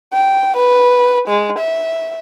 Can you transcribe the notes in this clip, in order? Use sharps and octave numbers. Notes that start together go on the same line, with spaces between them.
G5
B4
G#3
E5